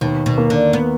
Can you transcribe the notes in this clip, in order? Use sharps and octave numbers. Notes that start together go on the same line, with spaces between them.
D#2 B2
B2
A#3
D3
B3